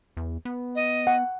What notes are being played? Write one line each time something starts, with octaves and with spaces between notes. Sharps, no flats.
E2
B3
D#5
F#5